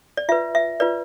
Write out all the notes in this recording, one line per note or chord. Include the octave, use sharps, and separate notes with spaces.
D5
F4 B4 E5
E5
F4 B4 D5